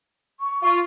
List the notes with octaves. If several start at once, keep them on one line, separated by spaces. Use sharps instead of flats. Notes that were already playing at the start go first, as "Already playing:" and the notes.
C#6
F4